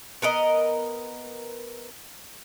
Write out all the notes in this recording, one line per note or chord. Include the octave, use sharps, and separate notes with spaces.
B3 A#4 D#5